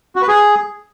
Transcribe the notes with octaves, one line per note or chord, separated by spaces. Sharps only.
F#4
B4
G#4